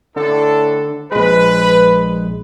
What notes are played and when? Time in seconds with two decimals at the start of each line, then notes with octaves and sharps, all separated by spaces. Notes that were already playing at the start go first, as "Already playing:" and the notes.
0.16 A2 D3 D4 A4
1.12 A#1 G#3 B4